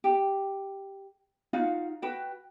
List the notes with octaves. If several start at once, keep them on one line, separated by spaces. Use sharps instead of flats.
G4
D#4 F4 F#4 F5
F#4 B4 G5